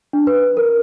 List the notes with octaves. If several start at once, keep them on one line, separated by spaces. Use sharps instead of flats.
D4
B4
A#4